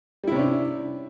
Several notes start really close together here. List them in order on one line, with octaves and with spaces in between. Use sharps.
G3 E4 C3 C#4 D4